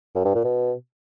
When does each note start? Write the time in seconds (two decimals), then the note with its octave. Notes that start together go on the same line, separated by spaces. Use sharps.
0.15 F#2
0.25 G2
0.35 A#2
0.44 B2